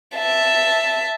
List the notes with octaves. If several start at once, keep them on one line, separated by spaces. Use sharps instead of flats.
E5 A5